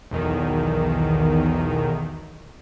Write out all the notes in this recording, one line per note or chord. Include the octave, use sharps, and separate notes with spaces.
B1 E2 D#3